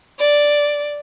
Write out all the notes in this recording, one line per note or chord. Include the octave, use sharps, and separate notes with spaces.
D5